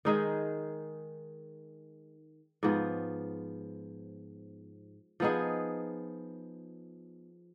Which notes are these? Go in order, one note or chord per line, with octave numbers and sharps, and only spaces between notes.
D#3 G#3 D#4 G#4
G#2 F3 B3
F3 B3 D#4 G#4